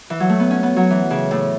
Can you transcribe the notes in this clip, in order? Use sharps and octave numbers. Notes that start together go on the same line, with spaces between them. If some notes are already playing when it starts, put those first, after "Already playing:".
E3
F#3
A3
B3
C#4
B3
F#3
E3
C#3
A2